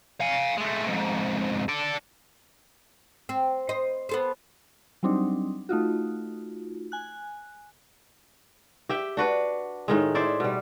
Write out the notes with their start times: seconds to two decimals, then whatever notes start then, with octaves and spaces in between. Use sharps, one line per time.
0.21 F5 G#5
0.58 G#3 A3
0.87 F2 G#2
1.68 A4 D5
3.29 C4
3.69 C5 D#5
4.09 B3 A4 C5
5.03 F#3 G3 C4 D4 D#4
5.69 A3 D#4 F4 F#4
6.92 G#5 F#6
8.89 G4 E5 G5
9.17 D4 F#4 B4
9.88 A2 D#3 G#3
10.15 E4 C5 D5 E5
10.40 B2 G3